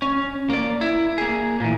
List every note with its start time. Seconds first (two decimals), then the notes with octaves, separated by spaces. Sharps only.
0.02 C#4
0.50 A#3 D5
0.81 E4
1.18 A#3 G#4
1.60 A#2 E3